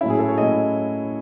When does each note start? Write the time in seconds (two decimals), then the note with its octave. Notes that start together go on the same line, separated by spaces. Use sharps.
0.01 A2 F#3 C#4 E4
0.10 G#4
0.19 A4
0.29 C#5
0.38 A2 F#3 C#4 D#5